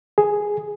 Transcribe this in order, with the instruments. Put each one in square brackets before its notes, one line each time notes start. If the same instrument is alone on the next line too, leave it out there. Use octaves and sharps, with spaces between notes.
[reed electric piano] G#4